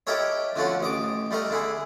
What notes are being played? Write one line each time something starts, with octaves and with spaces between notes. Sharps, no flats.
D#4 E4 G4 A4 A#4 C#5
D3 F3 A3 C#4 F#4
A1 D#5 D6
G3 A3 A#4 D#5
D3 E4 G#4